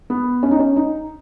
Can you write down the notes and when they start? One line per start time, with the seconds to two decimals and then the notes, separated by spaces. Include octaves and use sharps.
0.10 B3
0.43 C#4
0.51 D#4
0.59 C#4
0.76 D#4